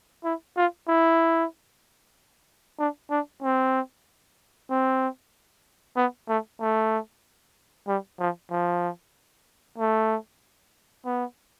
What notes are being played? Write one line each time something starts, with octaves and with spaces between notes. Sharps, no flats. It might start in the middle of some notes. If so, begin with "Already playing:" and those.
E4
F4
E4
D4
D4
C4
C4
B3
A3
A3
G3
F3
F3
A3
B3